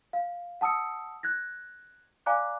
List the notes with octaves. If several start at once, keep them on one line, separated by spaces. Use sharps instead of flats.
F5
F#5 A5 D#6 E6 C#7
F#6 G#6 A#6
D5 F5 G#5 A#5 D6 F#6